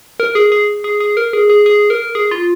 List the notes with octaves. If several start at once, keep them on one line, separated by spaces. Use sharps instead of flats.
A#4
G#4
G#4
G#4
G#4
A#4
G#4
G#4
G#4
A#4
G#4
F4